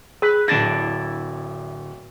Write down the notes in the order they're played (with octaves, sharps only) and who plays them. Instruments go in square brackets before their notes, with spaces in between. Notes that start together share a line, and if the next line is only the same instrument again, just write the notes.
[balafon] G#4 [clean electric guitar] B4
[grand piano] D1 A#6 [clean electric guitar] E4 D5 A5